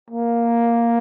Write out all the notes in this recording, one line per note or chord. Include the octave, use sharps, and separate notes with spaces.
A#3